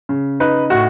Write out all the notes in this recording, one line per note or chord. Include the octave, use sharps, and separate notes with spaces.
C#3
D#4 B4
A2 F#4